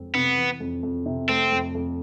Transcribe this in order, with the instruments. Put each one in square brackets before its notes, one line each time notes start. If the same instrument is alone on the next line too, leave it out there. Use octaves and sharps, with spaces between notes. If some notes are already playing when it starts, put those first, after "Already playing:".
Already playing: [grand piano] F2 G#3 C4
[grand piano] C3 [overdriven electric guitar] B3
[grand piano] E3
F2
F2
C3
[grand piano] A3 [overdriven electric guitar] C4
[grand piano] F2
F2